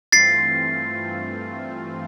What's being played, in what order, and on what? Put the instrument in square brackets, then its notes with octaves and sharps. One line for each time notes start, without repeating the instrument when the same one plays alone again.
[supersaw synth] G2 E3 A3 C4 F4 [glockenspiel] A6 C7